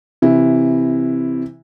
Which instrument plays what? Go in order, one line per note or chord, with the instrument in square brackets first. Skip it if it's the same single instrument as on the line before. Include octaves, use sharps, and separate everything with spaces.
[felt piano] C3 E3 E4